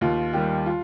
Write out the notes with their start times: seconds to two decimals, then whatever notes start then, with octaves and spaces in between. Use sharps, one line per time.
0.01 D#2 F4
0.33 D#3 G3 G4
0.66 F4